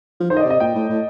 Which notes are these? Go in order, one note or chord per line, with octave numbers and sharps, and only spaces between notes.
F3
D#3 C5
D#5
D5
C3
D#5
A#2 G5
A2
A2